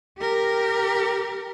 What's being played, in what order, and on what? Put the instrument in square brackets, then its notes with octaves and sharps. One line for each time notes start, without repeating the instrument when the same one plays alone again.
[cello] G4 A#4